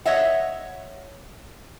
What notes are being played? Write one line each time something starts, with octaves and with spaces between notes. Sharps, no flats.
C#5 D#5 E5 F#5